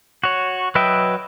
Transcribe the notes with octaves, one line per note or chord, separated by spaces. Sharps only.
F#4 C#5
F#3 B4 D#5 E5 G5